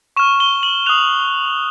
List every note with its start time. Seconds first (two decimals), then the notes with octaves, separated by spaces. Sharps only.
0.17 C#6 F6 E7
0.40 G7
0.63 F#7
0.86 D#6 F#6 F7